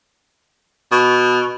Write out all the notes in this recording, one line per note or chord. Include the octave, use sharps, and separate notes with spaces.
B2